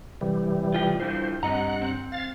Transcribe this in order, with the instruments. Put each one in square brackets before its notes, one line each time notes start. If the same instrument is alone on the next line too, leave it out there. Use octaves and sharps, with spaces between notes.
[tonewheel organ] C3 E3 G3
[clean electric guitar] F4 G5
[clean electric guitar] G2 E3 F3 [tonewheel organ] C5
[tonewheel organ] G2 F#5 [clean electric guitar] C4 D#5 A#5
[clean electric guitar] C4
[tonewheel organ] F5 A6